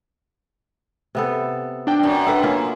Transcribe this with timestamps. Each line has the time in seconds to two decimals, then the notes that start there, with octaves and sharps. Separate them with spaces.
1.15 C3 B3 A4
1.87 D4 G5
2.03 F#2
2.26 A4 B4 F#5
2.43 A#3 C#4 F4